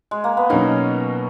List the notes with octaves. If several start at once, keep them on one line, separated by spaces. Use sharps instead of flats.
G#3
A#3
B3
B2 F#3 A#3 C#4 D#4